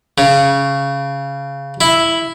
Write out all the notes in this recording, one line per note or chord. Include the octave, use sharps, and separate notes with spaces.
C#3
E4